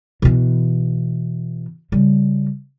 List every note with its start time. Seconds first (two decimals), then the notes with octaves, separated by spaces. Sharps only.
0.22 B2 E3
1.92 C#3 G3